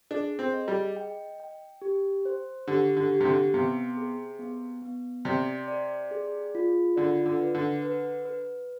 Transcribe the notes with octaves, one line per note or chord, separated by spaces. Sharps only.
D4 G#4
C4
D#5
G3
G5
G5
G4
C5
D3 G4
D3
G4
C3
D3
C3 B3
G#4
B3
B3
C3 D5
D5
G#4
F4
D3 D5
D3
B4
D3
B4
B4